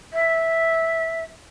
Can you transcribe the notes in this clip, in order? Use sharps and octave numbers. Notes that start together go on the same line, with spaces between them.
E5